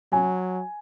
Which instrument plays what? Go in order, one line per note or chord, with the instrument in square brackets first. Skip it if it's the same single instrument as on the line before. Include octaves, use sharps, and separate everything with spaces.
[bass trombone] F#3 [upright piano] G#5